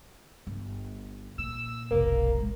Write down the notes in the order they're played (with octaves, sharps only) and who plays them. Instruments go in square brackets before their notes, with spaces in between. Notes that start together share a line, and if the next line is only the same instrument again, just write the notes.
[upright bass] G1
[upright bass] A#2 [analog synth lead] E6
[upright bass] F1 B1 [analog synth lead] A#3
[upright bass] A2 G#3